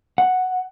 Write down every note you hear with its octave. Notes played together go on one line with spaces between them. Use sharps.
F#5